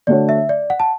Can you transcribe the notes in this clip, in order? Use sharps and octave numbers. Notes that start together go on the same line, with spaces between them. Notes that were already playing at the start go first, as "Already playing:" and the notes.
D3 A3 D4 F#4 C#5 D5
E5
D5
F#5
A5